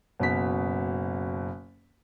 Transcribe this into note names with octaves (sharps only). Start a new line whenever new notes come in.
F#1 B2 B6